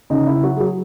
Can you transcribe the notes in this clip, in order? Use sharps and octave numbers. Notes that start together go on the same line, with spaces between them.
C#3 D#4
C#3 E4
F#3 F#4
F#3 G#4